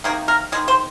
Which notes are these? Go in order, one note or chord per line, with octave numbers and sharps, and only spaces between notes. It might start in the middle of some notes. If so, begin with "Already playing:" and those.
C3 D#3 A#3 G#4
A#4
D#3 G#3 G#4
C5